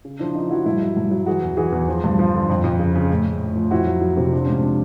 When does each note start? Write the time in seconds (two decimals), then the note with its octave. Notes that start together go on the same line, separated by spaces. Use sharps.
0.05 C#3
0.19 F3 D4 E4
0.35 C#3 D#4 F4
0.50 F3 E4 F#4
0.66 G2 E4 F#4
0.81 F#3
0.97 G2
1.11 F#3
1.26 E3 F#4 G#4
1.42 E2
1.57 E3 F#4 G#4
1.72 E2
1.88 F3
2.04 G2
2.19 F3
2.35 D3
2.50 F2
2.64 F2
2.79 C#3
2.96 C#3
3.11 A2
3.26 A2
3.41 A2
3.56 F3
3.71 F2 E4 F#4
3.86 F#3
4.01 F#3
4.17 C3
4.32 F3 D4
4.45 G#2 C#4
4.58 F3 C4 D4